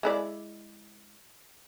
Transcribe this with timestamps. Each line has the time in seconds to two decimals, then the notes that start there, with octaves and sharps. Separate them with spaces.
0.03 G#3 E4 D5